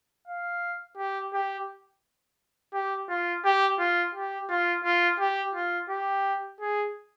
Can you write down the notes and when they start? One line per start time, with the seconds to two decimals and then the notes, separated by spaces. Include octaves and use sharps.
0.28 F5
0.98 G4
1.33 G4
2.74 G4
3.09 F4
3.45 G4
3.79 F4
4.15 G4
4.49 F4
4.84 F4
5.20 G4
5.55 F4
5.90 G4
6.61 G#4